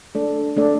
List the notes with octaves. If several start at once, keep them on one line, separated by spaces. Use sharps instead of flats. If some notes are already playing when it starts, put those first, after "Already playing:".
A3 D4 A4 D5
A3 D4 A4 D5